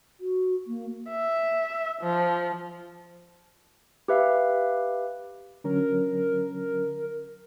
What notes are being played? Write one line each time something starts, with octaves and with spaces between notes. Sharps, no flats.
F#4
A#3
E5
F3
G4 B4 E5 F5
D3 F#3 C#4 A#4